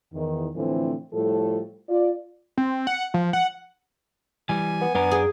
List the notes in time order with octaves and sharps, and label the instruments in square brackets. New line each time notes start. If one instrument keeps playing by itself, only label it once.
[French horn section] E2 D#3
A2 D3 E3 F3 A3 C4
A2 F3 G3 A4
F4 D5
[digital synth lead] C4
F#5
F3
F#5
[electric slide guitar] E3 G3 [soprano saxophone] G#5
[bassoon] B3
[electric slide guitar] F#2 D4 A#5 [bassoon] B3
[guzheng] G#4